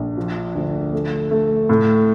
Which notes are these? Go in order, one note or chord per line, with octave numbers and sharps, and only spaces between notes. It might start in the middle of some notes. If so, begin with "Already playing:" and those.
Already playing: A#1
F3
D2
A3
A3
A2